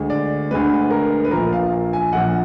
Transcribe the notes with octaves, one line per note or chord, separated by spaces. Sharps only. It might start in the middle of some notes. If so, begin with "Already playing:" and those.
Already playing: D2 D3 G#3
D5
D2 D3 G#3 B4
A#4
B4
A#1 A#2 F3 A#4
F5
G#5
A#1 A#2 F3 F#5